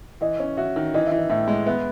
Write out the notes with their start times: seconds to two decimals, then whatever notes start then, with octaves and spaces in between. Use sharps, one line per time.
0.21 E3 D#5
0.40 C#4
0.57 F#4 E5
0.76 D#3
0.94 E3 D#5
1.06 E5
1.11 E3
1.18 D#5
1.30 A2 E5
1.48 G#3 D#5
1.66 B3 E5